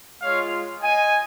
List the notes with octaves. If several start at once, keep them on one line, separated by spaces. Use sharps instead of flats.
G#3 F4 C#5 F5
D#5 G#5